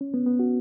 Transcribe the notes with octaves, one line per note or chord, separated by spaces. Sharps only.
C#4
B3
B3
F#4